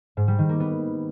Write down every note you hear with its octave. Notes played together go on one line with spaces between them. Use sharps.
G#2
G3
D#3
A#3
B3